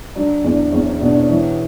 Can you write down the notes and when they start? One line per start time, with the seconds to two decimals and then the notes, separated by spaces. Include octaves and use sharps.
0.16 F#3 D4
0.44 E2 D4
0.72 E2 C#4
0.87 C#4
1.01 B2 D4
1.15 C#4
1.30 E3 C#4